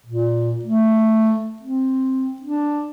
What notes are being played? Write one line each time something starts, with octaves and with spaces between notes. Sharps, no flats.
A#2
A3
C4
D4